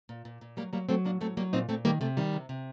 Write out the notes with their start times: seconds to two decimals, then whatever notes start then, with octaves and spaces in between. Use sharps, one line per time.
0.09 A#2
0.25 A#2
0.41 A#2
0.57 F#3 G3 A#3
0.73 F#3 G3 A#3
0.89 F#3 A3 C4
1.04 A2 A#3 D4
1.21 F#3 A3 C4
1.37 F#3 G3 A#3
1.53 A#2 C4 D#4
1.69 A#2 A3 C4
1.85 D#3 G3 A#3
2.01 C3 A3
2.17 D#3 G3
2.33 C3
2.49 C3